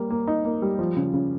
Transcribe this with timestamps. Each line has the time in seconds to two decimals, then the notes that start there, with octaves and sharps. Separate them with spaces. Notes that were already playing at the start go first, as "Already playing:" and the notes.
Already playing: G3 A#3
0.10 A#3
0.27 D#4
0.45 A#3
0.62 G3
0.79 F3
0.97 C#3
1.14 C#3